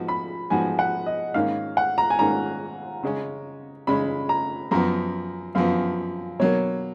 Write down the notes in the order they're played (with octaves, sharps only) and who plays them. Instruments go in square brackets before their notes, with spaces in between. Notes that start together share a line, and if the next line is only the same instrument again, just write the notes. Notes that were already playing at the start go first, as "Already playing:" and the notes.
Already playing: [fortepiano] G#2 F3 B3 F#4
[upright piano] B5
[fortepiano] G#2 F3 B3 F#4 [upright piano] G#5
[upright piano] F#5
D#5
[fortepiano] G#2 D#3 A#3 C#4 [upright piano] F5
[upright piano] F#5
A#5
G#5
[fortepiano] G#2 D#3 A#3 C#4 [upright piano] A#5
[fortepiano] C#3 G#3 C#4
[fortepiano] C#3 G#3 C#4 [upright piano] B5
[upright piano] A#5
[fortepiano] F#2 F3 B3 [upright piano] A#5
[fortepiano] F#2 F3 B3 [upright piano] F5
[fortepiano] B2 F#3 A#3 [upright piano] C#5